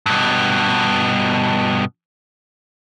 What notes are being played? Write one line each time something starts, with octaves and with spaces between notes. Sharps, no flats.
G2 B2